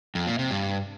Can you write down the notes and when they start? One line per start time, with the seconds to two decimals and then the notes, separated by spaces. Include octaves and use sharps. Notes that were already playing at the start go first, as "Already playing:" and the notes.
0.15 F2
0.27 A#2
0.39 C3
0.51 G2